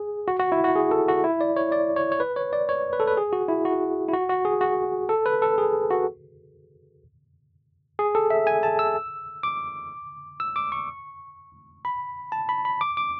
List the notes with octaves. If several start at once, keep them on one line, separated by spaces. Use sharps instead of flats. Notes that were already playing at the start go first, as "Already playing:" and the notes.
Already playing: G#4
F#4
F#4
E4
F#4
G#4
A4
F#4
E4
D5
C#5
D5
C#5
C#5
B4
C#5
D5
C#5
B4
A4
B4
G#4
F#4
E4
F#4
E4
F#4
F#4
G#4
F#4
A4
B4
A4
G#4
F#4
G#4
A4
E5
G#5
A5
E6
D6
E6
D6
C#6
B5
A5
B5
B5
D6
D6